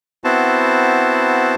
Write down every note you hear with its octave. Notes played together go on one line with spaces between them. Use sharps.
B3 C4 E4 F#4 C5 A5